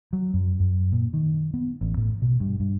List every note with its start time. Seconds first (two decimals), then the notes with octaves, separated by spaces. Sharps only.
0.13 F#3
0.34 F#2
0.60 F#2
0.92 A#2
1.13 D#3
1.54 B3
1.81 A1
1.97 A2
2.22 B2
2.40 G2
2.60 G2